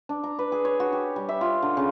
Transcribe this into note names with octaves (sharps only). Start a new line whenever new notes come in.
D4
A#5
B4
G#4
C#5
F#4
G4
G3
E5
F4
D3
C#3